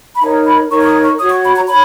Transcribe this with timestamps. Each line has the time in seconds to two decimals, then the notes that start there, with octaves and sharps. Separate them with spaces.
0.15 B5
0.21 D#4 A#4 C#5 A#5
0.46 B5
0.70 D#4 A#4 C#5 C#6
0.81 C#6
0.86 D#6
1.03 C#6
1.19 F#4 C#5 D#6
1.31 C#6
1.44 B5
1.56 A#5
1.68 C#5 B5